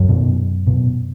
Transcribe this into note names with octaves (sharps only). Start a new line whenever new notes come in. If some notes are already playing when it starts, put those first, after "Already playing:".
Already playing: F#2 F#3
B2
B2